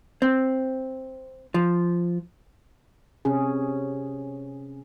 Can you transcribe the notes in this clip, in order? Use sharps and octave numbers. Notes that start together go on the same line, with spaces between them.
C4
F3
C3 C#4 G#4